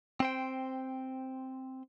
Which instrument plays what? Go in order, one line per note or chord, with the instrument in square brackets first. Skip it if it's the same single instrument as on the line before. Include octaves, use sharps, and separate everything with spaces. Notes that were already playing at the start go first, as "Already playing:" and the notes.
[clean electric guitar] C4 C5 G5